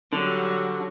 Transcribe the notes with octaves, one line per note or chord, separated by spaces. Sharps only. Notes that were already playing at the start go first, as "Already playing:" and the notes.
D3 F#3 G3